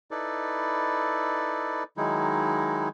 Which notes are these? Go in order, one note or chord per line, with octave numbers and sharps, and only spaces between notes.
D#4 E4 A4 B4 D5
D#3 F#3 G#3 D#4 E4